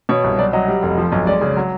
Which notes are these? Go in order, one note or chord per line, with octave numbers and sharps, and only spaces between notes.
B2 C#5
C2
F#3 D5
F#3 D#5
G3
F1
F3
B1
G#3 D5
C#3
F#3